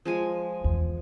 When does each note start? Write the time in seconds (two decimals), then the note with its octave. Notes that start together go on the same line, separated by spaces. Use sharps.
0.05 F3 G#3 G#5
0.64 E2